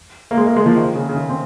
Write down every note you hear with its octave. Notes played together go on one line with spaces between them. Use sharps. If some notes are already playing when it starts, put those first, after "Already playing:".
A#3
G#3
A#3
G#3
F3
D#3
C#3
C#3
D#3
C4